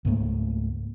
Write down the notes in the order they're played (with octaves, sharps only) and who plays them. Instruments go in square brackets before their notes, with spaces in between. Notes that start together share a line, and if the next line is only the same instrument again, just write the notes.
[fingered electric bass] C#2 G#2 A3 A#3